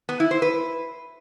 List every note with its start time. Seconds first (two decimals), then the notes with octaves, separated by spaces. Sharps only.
0.09 B3
0.20 E4
0.31 C5
0.42 B4